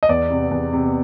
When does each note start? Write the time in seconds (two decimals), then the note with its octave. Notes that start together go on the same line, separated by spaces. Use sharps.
0.03 D#5
0.09 E2 D5
0.30 C3
0.51 E2
0.73 C3